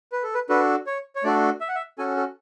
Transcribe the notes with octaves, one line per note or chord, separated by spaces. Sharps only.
B4
A4
B4
D4 F#4 A4 B4
C#5
C#5
A3 D4 F#4 A4 D5
E5
F#5
E5
C#4 F#4 A4 G#5
A4